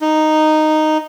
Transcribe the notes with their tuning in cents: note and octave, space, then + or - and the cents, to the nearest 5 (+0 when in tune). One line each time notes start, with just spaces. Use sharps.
D#4 -5